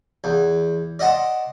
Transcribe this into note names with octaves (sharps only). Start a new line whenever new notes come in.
E2
D5 D#5 F#5 A5 C6